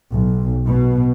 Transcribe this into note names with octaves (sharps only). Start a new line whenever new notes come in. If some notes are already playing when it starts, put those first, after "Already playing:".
B1
B2